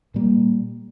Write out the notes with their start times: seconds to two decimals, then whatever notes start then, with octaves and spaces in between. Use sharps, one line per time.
0.14 A#2 G3 A#3